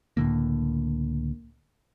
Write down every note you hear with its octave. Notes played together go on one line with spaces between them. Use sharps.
C#2 A2 D3 A#3